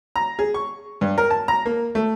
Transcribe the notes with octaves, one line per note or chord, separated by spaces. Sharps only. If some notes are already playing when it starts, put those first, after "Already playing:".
A#5
G#4
C#6
G2
A#4
A5
A#5
A#3
A3